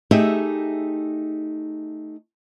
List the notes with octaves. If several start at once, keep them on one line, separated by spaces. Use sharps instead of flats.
A3 D#4 G4 G#4 E5